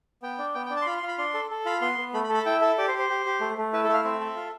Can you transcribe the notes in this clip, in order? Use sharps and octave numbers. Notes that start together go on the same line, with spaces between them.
B3 G5
D4
B3 G5
G5
D4
A5
C6
F4 B5
C6
F4
B5
D4 C6
A4
A4
F4 B5
B3 C6
B3
A3 B5
B5
A4
B5
E4 G5
A4 E5
G4 D5
C5
G4
C5
G4
G4
A3
A3
E4 B4
A4
A3 E5
F5
C4 E5
A4
F4